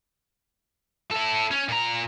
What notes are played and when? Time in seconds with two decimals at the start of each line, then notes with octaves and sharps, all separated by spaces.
1.11 E4 A4
1.51 C#4
1.69 A#2 A#5